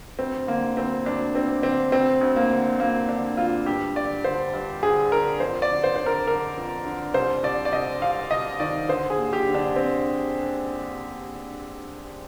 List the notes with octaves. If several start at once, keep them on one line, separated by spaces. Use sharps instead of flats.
D2 C4
D3 A#3
D2 C4
D2 D4
D2 C4
D3 C4
D2 C4
D2
A#3
D3
D2 A#3
D3 D4
D2 F4
G2 G4
D3 D5
D3 C5
G2
D3 G#4
D3 A#4
F2 C5
D5
D3
C5
D3 C5
A#4
D3 A#4
F2
D3
C2 C5
C2 D5
D5
C2 D#5
C2 F5
C2 D#5
D#3 D5
D3 C5
G#4
D#2
G4
D3
D4
C4